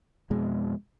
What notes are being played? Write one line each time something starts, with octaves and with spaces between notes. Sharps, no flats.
F2 B2 G#3